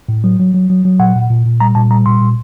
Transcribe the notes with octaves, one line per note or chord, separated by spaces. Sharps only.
A2
F#3
F#3
F#3
F#3
F#3
A#2 F#5
A#2
A#2
A#2
G3 A#5
A#2 A5
G3 A#5
A#2 C6
A#2